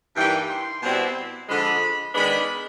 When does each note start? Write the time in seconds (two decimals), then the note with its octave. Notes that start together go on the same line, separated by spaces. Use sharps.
0.16 G2 E3 G3 A#3 D#4 G5
0.49 C6
0.82 B2 G3 C4 E4
1.48 D3 F3 G#3 B5
2.14 D#3 G#3 B3 D4 B5